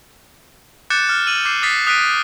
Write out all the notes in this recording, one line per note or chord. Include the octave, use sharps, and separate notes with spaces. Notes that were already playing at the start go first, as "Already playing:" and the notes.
D6 F#6 G6 A6 C#7 E7
F6
E6 D#7 F#7
D6 G6 C7
D#6 A6 B6 C7
D#6 F#6 B6 D7 D#7